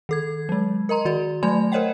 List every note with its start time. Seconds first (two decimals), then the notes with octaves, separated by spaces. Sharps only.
0.09 D#3 A4 G#6
0.49 F#3 G#3
0.89 A#4 D#5 A#5 C6
1.05 D#3 F#4 D5
1.43 F#3 A3 D5 G#5 B5 G#6
1.72 A#4 C5 C#5 D#5 F#5 G5